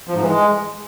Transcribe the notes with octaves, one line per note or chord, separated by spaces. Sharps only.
F3
G#2
E3
G#3